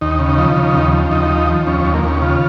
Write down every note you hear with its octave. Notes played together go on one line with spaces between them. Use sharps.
D#2 D#4
C#3
D#4
F3
C#3
D#2
F3
D#2 D#4
F3
F3
D#2 C#4
D#2 C#4
A#3
D#2 C#4
C#3 F4